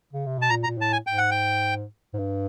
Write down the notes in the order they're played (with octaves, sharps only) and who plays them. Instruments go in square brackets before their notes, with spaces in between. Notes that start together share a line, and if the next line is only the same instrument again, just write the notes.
[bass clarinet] C#3
C3
[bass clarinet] B2 [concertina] A5
[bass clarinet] A#2 [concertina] A#5
[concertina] A#5
[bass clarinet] A#2
[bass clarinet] A2 [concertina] A5
[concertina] G#5
[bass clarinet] G#2 [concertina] G5
[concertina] F#5
G5
[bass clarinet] G#2
G2